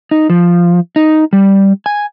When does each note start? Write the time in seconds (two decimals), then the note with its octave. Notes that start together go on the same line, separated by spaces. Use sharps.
0.11 D#4
0.30 F3
0.96 D#4
1.33 G3
1.86 G#5